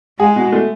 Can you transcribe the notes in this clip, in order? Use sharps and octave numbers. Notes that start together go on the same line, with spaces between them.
G#3 G#4
B2
A3